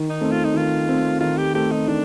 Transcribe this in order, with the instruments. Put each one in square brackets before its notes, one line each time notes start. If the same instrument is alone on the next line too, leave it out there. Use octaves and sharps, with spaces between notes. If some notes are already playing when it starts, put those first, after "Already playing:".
Already playing: [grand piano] D#3
[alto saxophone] D#4
[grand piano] A3 C4
[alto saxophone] F4
D#4
[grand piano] D#3 [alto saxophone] F4
[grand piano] A3 C4
[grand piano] D#3 [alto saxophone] F4
[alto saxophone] G4
[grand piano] A3 C4 [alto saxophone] G4
[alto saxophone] D#4
[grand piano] D#3 [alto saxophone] D4